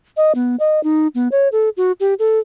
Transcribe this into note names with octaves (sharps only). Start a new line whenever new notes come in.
D#5
B3
D#5
D#4
B3
C#5
A4
F#4
G4
A4